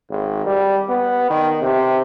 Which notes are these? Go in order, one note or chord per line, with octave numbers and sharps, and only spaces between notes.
G#1
G3
B3
D#3
C3